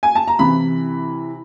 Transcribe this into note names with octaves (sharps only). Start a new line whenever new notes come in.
G#5
A5
A#5
C3 E3 B5